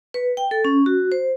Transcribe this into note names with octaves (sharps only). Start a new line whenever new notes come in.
B4
G5
A4
C#4
F#4
C5